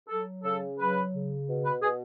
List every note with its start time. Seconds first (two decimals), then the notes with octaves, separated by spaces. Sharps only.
0.08 F#3 A4
0.43 C#3 A4
0.78 F#3 B4
1.13 C#3
1.47 B2
1.65 B4
1.81 B2 G#4